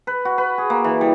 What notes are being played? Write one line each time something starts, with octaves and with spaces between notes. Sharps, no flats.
B4
F#4
B4
G#4
A#3
E3
G3